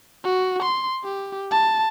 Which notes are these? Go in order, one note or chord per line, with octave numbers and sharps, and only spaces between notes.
F#4
C6
G4
A5